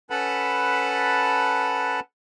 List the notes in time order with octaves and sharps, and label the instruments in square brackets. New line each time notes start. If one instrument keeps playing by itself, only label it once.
[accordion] C#4 A4 B4 F#5 A5 B5